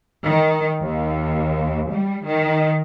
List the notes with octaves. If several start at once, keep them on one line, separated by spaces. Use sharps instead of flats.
D#3
D#2
G3
D#3